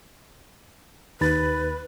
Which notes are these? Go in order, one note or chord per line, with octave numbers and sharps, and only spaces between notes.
D#2 D#4 B4 B5 A6